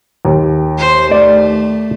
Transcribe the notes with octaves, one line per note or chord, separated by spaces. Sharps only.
D#2
C5
A3 D5